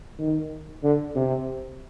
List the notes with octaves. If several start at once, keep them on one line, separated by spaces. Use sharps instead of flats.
D#3
D3
C3